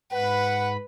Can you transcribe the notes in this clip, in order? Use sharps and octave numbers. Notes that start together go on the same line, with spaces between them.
G#2 B4 F#5 B5